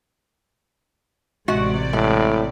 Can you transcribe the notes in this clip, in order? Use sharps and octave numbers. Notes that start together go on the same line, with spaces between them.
A1 C3 G#3 F#4 D5 F#5
A2 G#3